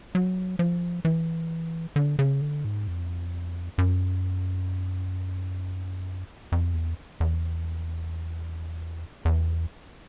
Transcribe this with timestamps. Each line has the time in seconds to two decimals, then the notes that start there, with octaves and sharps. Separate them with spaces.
0.15 F#3
0.59 F3
1.05 E3
1.96 D3
2.19 C#3
2.41 D3
2.65 G#2
2.88 F2
3.78 F#2
6.52 F2
6.74 E2
7.20 E2
9.25 E2